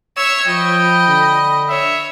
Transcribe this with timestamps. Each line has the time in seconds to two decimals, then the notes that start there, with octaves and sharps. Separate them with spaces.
0.17 C#5 E5 E6
0.47 F3 D#5 G5 B5
1.09 D3
1.69 C#5 E5